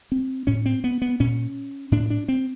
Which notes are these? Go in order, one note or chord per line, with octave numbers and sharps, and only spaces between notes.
C4
A2 C#4
C4
B3
B3
A#2 C#4
A2 D4
D4
C4